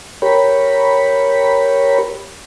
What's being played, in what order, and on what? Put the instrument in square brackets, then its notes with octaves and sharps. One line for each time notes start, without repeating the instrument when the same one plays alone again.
[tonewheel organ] G4 A#4 C#5 B5